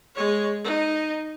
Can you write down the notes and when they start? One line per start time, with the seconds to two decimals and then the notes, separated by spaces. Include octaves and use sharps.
0.16 G#3 C#5
0.64 D#4